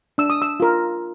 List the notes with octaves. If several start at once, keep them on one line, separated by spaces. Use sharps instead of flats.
D4 E6
D#6
E6
F4 A#4